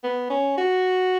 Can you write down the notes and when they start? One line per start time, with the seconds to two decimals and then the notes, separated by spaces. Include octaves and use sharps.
0.04 B3
0.30 C#4
0.58 F#4